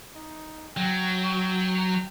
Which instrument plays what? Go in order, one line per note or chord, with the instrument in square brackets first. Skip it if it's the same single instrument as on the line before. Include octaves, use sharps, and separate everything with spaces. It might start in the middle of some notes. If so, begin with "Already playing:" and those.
[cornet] D#4
[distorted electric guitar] F#3 [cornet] G5